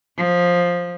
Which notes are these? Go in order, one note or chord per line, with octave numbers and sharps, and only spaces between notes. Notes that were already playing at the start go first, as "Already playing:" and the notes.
F3